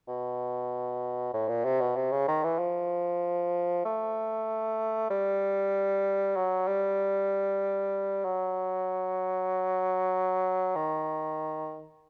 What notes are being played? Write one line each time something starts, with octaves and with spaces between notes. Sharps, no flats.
B2
A2
A#2
C3
B2
C3
C#3
D#3
E3
F3
A3
G3
F#3
G3
F#3
D#3